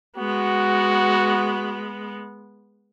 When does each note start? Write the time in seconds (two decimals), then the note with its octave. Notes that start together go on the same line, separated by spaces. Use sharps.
0.17 G#3 B3 F#4